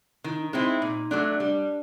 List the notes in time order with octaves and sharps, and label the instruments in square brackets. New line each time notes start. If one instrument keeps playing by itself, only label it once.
[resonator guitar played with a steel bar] D#3 [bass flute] E4
[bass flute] D#4
D4
D#4
[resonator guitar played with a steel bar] G#3 C4 E4
A#2
F#3 A3 D4
[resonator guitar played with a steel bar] G3 [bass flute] D4